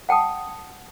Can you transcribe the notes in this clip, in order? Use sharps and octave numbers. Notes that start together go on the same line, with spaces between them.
F#5 G5 A5 D#6